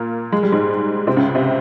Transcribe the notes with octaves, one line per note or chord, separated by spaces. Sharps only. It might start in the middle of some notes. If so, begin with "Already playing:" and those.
Already playing: A#2 A#3
G#3
G3
G#2 G#3
C3 C4
C#2 C#3
C3